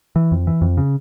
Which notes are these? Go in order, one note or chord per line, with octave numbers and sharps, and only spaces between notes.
E3
F2
E3
F2
C#3